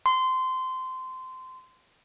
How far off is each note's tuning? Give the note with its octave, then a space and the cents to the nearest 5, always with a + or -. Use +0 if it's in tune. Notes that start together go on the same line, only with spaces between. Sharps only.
C6 -20